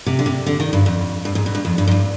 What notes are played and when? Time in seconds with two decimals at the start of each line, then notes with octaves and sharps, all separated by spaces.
0.06 C3
0.19 D3
0.26 C3
0.46 D3
0.60 D#3
0.73 G2
0.86 F2
1.25 G2
1.35 G#2
1.46 B2
1.55 G2
1.65 F2
1.78 G2
1.87 G#2
1.91 G2